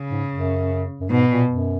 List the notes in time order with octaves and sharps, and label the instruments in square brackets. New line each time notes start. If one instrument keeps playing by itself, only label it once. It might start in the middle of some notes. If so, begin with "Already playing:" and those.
Already playing: [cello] C#3
[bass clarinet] G#2
F#2
F#2
[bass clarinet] G#2 [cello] B2
[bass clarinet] A#2
F#2